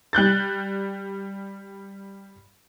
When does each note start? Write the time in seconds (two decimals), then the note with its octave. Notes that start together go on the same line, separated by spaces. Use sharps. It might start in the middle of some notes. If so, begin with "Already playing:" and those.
0.13 G3 F#6 G6 A6